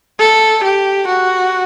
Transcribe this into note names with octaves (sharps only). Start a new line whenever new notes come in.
A4
G4
F#4